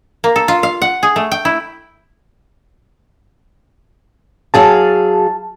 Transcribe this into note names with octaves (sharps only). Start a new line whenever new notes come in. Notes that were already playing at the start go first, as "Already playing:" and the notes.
A#3
A4
F4
F5
F#5
G#4
A3
G5
E4
F#3 G#4 F5 A5